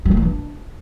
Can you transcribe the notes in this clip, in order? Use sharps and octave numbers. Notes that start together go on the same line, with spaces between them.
G3
A#3
E3
D4